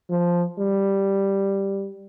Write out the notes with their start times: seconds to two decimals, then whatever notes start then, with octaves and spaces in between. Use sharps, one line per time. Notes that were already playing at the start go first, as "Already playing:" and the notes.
0.10 F3
0.59 G3